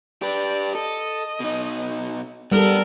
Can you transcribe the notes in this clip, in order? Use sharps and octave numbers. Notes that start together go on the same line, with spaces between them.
G4 B4 D5
A4 D#5
B2 D#4
G3 B3 A4 A#4